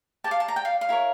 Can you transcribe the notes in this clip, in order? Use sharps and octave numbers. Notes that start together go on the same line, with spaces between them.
G4 D5 F5 A5
A5
A#5
G5
F5
F5
E4 A#4 C#5